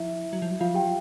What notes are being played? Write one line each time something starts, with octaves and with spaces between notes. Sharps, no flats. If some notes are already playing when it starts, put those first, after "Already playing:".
Already playing: F3 E4 E5
F#3
F3
F#3
F3 F4 F5
F#3 G4 G5